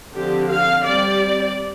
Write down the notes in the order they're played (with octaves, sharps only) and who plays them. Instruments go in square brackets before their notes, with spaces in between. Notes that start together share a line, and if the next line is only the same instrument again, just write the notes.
[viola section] D3 F3 C4 G4
F5
G3 C4 D5